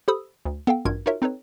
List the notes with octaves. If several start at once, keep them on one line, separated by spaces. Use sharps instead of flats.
G4 A4 C5 B5 D#6 E6
D2
B3 A4 F5 G5
A1 G2 F4 F#4 A#4 G#6
D#4 F4 F#4 A#4 C#5 E5
C4 D#4 A4 B4 C#5